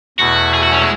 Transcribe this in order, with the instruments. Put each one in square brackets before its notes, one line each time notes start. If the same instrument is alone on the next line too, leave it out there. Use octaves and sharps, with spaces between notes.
[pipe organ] E2 B2 A3 E4 [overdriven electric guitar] F#4
[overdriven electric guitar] G#4
F#4
C#4
G#3